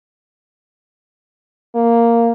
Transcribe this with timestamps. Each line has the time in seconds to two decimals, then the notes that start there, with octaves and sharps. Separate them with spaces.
1.75 A#3